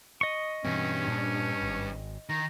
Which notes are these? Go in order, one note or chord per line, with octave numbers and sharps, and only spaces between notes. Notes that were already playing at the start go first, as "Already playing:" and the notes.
D#5 C#6
G2 B2 E3 C4 C#4
A#2 D4
G#1
D#3 A#5